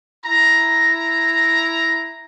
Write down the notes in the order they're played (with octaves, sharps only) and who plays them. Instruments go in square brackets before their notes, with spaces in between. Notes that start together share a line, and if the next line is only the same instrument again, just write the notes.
[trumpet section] E4 A#5